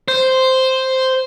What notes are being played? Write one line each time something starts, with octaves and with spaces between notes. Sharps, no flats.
C5